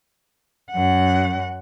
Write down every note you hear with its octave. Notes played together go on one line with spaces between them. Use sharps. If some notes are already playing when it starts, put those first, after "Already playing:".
F#2 F#5